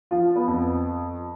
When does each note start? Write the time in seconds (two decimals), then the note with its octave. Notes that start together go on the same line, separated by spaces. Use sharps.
0.11 F3 F4
0.36 B3
0.48 F2